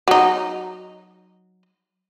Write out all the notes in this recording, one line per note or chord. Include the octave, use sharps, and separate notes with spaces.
F#3 D#4